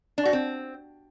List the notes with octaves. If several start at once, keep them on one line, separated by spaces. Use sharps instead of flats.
D4
F#4
C4